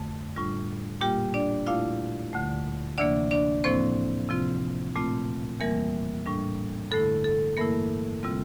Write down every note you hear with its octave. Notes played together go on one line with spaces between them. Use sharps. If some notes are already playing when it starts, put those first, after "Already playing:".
Already playing: F2 D3 A3
A2 G3 D4 F4
A#2 G3 A#3 F4 G4 G5
D4 D5
A#2 A3 E4 F4 F5
D2 D3 A3
D2 C3 E3 A#3 D4 D5
D4 D5
A2 F3 A#3 C4 E4 C5
C3 F3 C4 F4
A#2 A3 C4 F4
E2 E3 G3 A#3 A#4
A2 G3 D4
G2 D3 A3 E4 A4
A4
G2 E3 A3 A#3 E4 A#4
C3 G3 C4 F4